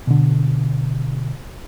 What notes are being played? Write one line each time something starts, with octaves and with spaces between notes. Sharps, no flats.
B2 D3